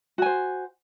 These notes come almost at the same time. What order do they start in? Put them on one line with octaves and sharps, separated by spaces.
F#4 G#5 C5